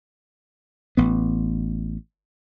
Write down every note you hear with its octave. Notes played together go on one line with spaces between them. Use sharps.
A1 B3